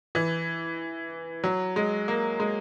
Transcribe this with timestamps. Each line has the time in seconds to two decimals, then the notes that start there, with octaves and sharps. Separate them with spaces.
0.15 E3
1.44 F#3
1.76 G#3
2.08 A#3
2.40 G#3